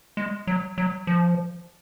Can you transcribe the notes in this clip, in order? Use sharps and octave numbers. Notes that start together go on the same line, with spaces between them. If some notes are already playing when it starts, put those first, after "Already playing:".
G#3
F#3
F#3
F3